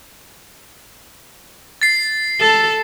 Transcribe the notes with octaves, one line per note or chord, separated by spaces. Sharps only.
A6 C7
A4